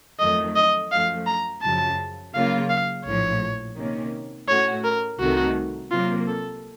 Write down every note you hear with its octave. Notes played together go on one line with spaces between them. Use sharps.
F2 D#3 F#3 A3 D#5
D#5
F#2 F3 A3 F5
A#5
F#2 C#3 F3 A5
C#3 F#3 A#3 F4 F5
F5
A#1 A2 F3 C#5
C3 D#3 A#3 C#4
A2 A3 C#4 F#4 C#5
A#4
C2 C3 D#3 A3 D#4 F#4
C3 F#3 A#3 F4
A4